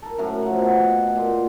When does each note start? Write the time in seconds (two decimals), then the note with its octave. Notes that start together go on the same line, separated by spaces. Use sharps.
0.02 A4 A#4
0.18 F#2 A2 A3 A#5
0.42 F3 F#5
0.59 B2
1.16 A#2 C6